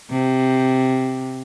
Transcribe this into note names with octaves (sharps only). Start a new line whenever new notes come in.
C3